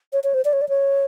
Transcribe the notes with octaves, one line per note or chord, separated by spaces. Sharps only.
C#5
C#5
C5
D5
C#5
D5
C#5